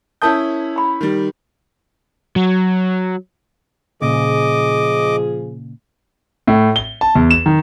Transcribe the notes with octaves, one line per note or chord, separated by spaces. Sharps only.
C#4 E4 A#4 A5 D#6 G6
A#5 B5
D#3 G3
F#3
A#2 C#3 F3 G#4 D#5 D6
A2
G7
A5
E2
E7
D#3